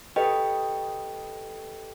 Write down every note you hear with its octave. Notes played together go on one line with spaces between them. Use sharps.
G4 A4 B4 D#5 G5